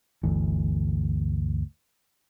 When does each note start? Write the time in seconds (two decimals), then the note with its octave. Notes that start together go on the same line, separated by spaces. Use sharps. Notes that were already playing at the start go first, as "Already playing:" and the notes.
0.23 G1 D2 E3